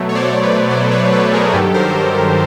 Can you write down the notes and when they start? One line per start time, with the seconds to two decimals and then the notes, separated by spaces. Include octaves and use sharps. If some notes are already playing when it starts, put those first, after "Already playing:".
Already playing: B2 F#3 A3
0.09 C#5
0.15 C5 D5
0.43 B4 C#5
0.70 B2 F#3 A3 C5 D5
0.91 B4 C#5
1.13 A4 B4
1.27 B4
1.33 G#4 A#4
1.53 G2 D#3 F#3 G4 A4
1.74 A#4 C5